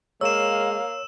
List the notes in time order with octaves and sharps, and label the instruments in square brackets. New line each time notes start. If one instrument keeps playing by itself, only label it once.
[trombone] G#3 [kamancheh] A#3 F5 [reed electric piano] C#5 [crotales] E6 E7